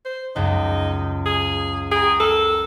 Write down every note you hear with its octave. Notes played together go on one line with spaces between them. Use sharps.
C5
C#2 F#2 D#4
G#4
G#4 G5 A#5
A4 A#4 F6